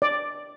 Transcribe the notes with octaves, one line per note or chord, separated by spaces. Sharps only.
D5